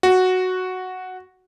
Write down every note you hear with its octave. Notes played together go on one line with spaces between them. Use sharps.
F#4